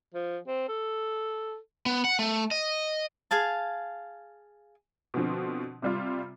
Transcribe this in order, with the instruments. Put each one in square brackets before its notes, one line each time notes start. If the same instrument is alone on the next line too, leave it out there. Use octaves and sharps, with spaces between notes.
[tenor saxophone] F3
C4
A4
[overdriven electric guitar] B3
F#5
A3
D#5
[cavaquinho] G#4 F5 A5
[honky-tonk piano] B2 D3 F3 C4
C3 G3 F4